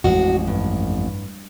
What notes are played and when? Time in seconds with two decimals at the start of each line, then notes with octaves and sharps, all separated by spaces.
0.04 A1 F2 G#3 F#4
0.47 G2